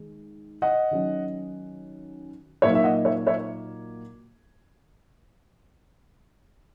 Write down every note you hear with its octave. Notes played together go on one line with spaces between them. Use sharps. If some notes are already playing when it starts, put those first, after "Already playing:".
Already playing: D#3 G#3
D#5 F#5
D#3 F#3 C#4
A#2 F#3 A#3 D#4 C#5 E5
E5
D#5 F#5
C#5 E5
C#5 E5